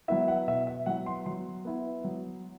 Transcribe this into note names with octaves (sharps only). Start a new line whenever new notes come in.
F#3 B3 E4 E5
F#5
B2 E5
E5
F#3 B3 E4 F#5
C6
F#3 C6
B3 E4
F#3